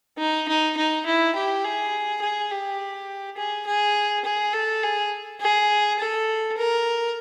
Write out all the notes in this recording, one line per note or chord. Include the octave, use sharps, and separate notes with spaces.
D#4
D#4
D#4
E4
G4
G#4
G#4
G4
G#4
G#4
G#4
A4
G#4
G#4
A4
A#4